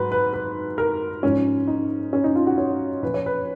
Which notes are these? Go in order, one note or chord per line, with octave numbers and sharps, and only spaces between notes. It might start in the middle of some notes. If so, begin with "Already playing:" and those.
Already playing: G#2 F#3 B4
B4
B4
A#4
G#2 F3 C#4
D#4
C#4
D#4
F4
F#4
C#5
A#2 F3 B4
C#5
B4